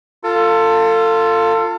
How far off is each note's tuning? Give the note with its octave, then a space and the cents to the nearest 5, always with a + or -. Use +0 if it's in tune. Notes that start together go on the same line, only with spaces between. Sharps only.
F4 +0 A4 +30